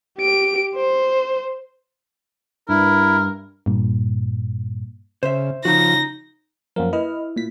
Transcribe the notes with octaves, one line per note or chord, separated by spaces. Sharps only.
G4 D7
C5
G2 E4 A#4
G2 A#2
C#3 C5 E5
C#3 F3 D#4 F#4 A#6
F#2 F3 A#3 A#4
E4 B4 D#5 F6
A#2 B6